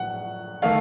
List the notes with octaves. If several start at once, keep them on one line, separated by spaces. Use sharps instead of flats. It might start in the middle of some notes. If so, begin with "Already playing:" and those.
Already playing: A#1 A2 F#3 F#5
D#3 A3 F5